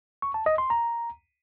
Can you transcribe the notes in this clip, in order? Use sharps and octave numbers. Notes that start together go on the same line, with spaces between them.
C#6
A5
D#5
C6
A#5